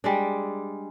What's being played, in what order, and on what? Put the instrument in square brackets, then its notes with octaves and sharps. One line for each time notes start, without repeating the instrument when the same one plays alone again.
[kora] G3 G#3 D4